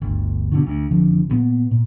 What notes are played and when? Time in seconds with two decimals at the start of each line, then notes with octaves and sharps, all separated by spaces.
0.01 G1 D2
0.52 B2 D3 D#3
0.66 D2
0.91 F#1 F2 D3 F3
1.30 G2 A#2 B3
1.71 A#2